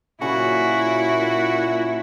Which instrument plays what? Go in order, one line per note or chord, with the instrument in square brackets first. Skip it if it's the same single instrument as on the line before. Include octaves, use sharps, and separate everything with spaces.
[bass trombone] A#2 [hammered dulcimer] C#3 F#3 B5 [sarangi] E4 [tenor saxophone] F#4